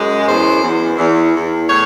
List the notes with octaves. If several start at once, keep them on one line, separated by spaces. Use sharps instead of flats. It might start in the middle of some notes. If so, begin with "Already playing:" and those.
Already playing: F#2 G#3
E2 C5
E2
E2
E2
A2 C#5